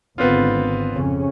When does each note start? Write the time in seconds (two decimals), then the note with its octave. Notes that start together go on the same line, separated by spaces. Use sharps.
0.18 G#1 D3 B3 C4 F4
0.93 F2 C#3 C#4